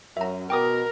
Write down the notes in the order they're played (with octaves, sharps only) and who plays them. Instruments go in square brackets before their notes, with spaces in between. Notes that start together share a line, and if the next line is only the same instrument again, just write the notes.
[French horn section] F#2 [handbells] E5 A#5
[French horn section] B2 [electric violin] A#4 [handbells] G5 D6 D#6